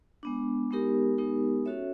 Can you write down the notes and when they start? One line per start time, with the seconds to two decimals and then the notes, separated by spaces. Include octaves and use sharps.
0.23 G#3 B3 D4
0.71 G#3 B3 D#4 G4 A#4
1.18 G#3 B3 D#4 G4 A#4
1.66 C#4 F#4 A4 C#5 E5